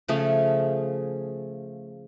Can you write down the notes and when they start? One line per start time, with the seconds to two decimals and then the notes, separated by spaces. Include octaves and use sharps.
0.08 C#3 F3 A3 G#4